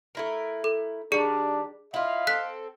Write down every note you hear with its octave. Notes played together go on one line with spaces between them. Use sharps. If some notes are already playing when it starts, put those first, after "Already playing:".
A3 E4 A#4
A4
D#3 G3 D4 G#4 D5 C#7
E4 F4 D#5 F5
C4 A4 F#6 B6